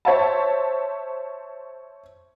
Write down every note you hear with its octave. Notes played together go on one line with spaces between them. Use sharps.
C5 C#5 E5 A5